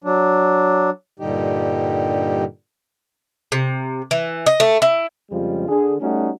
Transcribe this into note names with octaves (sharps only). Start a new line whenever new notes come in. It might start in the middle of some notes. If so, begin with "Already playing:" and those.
F#3 D4
G2 A#2 D3 G3 D#4 G4
C3
E3
D#5
A3
E4
F2 C#3 F3 G3 G#3 F4
D3 G#4
G3 A3 C#4 D#4 F#4